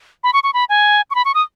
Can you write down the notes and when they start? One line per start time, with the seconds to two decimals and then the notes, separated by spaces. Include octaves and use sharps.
0.24 B5
0.33 C#6
0.44 C#6
0.54 B5
0.69 G#5
1.11 C#6
1.15 B5
1.25 C#6
1.35 D#6